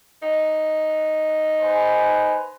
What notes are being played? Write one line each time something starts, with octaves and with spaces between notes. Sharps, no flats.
D#4
B4 C5 G#5